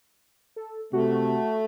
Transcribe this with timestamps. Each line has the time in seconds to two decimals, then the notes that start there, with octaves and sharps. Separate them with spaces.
0.56 A4
0.93 C3 A3 F#4